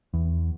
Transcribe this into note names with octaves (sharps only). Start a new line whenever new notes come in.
E2